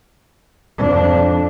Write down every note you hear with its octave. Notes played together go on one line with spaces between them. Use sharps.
F2 D4